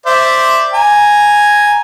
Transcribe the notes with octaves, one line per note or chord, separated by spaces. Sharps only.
C5 D5 E5
G#5 A#5